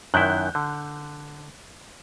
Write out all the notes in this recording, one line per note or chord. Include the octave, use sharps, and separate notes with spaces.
F#2 D#3 E4 F#6 G6
D3